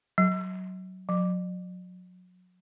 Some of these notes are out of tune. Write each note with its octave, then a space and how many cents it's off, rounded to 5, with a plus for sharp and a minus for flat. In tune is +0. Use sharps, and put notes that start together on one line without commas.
F#3 +10
F#3 -35